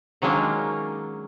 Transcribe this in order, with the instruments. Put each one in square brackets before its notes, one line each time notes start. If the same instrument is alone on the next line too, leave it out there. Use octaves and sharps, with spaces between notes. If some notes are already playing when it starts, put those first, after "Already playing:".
[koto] D#3 F#3 G#3 A#3 C#4 D4